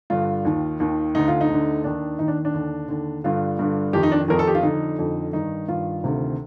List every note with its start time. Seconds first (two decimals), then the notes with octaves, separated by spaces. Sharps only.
0.10 G2 D3 F4
0.45 D#2 D#3
0.80 D#2 D#3
1.15 D2 D3 D#4
1.28 F4
1.41 D#4
1.50 D2 D3
1.84 D#2 D#3 D4
2.19 D#2 D#3 D#4
2.28 D4
2.45 D4
2.54 D#2 D3
2.89 D#2 D3
3.24 G2 D3 F4
3.59 G2 D3
3.93 F2 D#3 G4
4.03 D#4
4.12 D4
4.28 F2 D#3 A#4
4.39 A4
4.47 G4
4.55 F4
4.63 F2 D3 D#4
4.99 F2 D3
5.33 G2 D#3 D#4
5.68 G2 D#3 F4
6.03 D2 C3 D#3